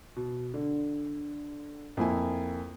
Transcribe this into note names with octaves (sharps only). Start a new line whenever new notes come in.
B2
D3
F2 A#3 E4 G#5